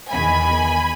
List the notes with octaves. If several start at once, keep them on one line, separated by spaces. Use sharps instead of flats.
E2 D#3 G#5 B5